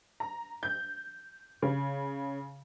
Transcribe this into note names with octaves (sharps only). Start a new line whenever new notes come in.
A#5
G6
C#3